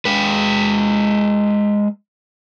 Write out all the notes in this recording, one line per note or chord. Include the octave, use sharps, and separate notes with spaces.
G#3 B4